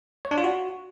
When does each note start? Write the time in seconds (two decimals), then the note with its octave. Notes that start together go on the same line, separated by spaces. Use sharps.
0.25 C#5
0.31 D4
0.38 F4
0.44 F#4